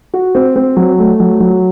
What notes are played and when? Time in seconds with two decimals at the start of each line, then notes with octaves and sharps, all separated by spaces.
0.14 F#4
0.35 C4
0.56 C4
0.76 F#3
0.98 A3
1.20 F#3
1.40 F#3